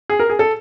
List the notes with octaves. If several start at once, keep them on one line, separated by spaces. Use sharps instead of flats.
G#4
A#4
G#4
A4